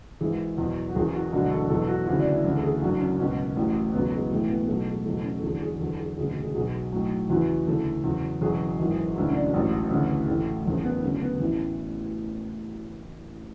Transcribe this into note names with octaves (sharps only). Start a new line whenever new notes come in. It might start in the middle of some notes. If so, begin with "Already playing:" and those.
G#1 G#2 E3 G#4
E2 B2 F#3
F#4
F#1 E2 C#3 F#3 G#4
F#4
E1 D2 D3 F#3 F#4
A4
E2 B2 F#3 A4
F#4
D2 C#3 E3 F#4
D4
E4
D2 C#3 E3
A4
G#4
F#1 F#2 D3 F#3 F#4
C#4
C#2 B2 F#3 C#4
A1 A2 F#3
E1 E2 C#3 F#3 B3
G#3
B1 A2 E3 A3
B3
B3
B1 B2 F#3 A3
G#3
F#1 E2 B2 F#3 A3
C#4
A4
E2 D3 F#3 G#4
G#4
E2 D3 F#3 A4
G#4
E1 D2 C#3 G#4
F#4
G#4
B1 B2 F#3 G#4
B1 A2 F#3
E2 C#3 E3 F#4
D2 C#3 E3 A4
E2 C#3 F#3
E1 E2 C#3 F#3 G#4
G#1 F#2 E3
E1 D2 D3 F#3 E4
C#4
D4
A1 G#2 F#3 C#4
D2 C#3 E3
A1 A2 E3 A3
F#1 E2 C#3
B3
D2 C#3 F#3 C#4
C#4
B3
A1 A2 E3 C#4